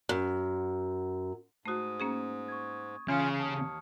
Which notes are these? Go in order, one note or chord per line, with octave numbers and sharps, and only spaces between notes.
F#2
G#2 A3 F#4 D#6 D#7
A#3 C#4 G#4
C#6 G#6
C#3 E3 C#4 F4 F6 C#7
D#2 A5 D#6